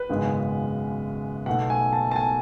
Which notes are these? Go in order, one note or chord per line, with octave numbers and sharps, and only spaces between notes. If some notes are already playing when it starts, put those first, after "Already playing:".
Already playing: B4
G#1 F#2 C#3 G#3 B3
B1 B2 A3 F#5
G#5
A5
A5
G#5